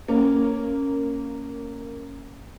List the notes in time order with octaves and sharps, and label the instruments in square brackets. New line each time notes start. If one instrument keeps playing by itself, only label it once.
[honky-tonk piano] A#3 C#4